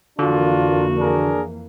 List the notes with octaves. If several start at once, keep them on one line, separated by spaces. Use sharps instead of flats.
F2 D3 E3 A#3 D4 F4 F#4
D4 G#4 A#4